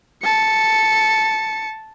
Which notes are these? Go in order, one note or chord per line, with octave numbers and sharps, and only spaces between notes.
A5 C#7